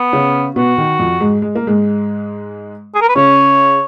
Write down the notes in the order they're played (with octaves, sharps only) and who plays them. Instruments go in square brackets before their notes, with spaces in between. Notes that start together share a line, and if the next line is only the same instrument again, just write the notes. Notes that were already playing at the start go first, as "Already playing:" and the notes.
Already playing: [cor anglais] B3
[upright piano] C#3 C#4
[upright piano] B2 B3 [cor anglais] F#4
[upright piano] D#3
F2 F3
G#2 G#3
G#3
A#3
G#2 G#3
[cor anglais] G#4
A#4
B4
[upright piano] C#3 C#4 [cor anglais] C#5